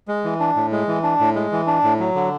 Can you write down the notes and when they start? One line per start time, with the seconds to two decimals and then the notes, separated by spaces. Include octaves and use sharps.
0.08 G#3
0.24 E3
0.40 D4
0.56 A2
0.72 G#3
0.88 E3
1.03 D4
1.20 A2
1.35 G#3
1.52 E3
1.67 D4
1.83 A2
1.99 F#3
2.15 D3